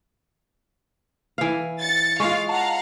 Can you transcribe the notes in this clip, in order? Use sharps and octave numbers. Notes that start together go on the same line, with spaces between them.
E3 F5
A6 C#7
G#3 F4 F5 C#6
F5 F#5 A5 A#5